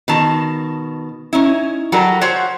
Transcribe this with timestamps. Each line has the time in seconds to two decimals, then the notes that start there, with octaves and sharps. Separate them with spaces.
0.08 B2 D#3 A5
1.33 C#4 D#4 E4
1.92 F#3 G3 F#4 A4 A#4
2.21 F4 F#4 C5 C#5 F#5